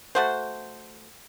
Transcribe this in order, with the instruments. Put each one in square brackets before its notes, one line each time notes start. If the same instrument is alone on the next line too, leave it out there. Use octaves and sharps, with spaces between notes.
[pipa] A3 F#4 C5